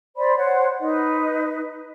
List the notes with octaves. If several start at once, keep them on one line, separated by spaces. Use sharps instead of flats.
C5 D5 B5
C5 C#5 F#5
D#4 B4 D#5